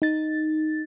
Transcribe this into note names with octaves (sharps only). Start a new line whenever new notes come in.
D#4 A6